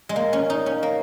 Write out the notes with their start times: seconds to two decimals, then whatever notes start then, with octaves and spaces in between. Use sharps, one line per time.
0.09 G#3
0.16 A#3
0.33 C#4
0.50 D#4
0.66 C#4
0.83 A#3